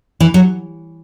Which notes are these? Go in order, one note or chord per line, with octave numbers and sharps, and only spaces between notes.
E3
F#3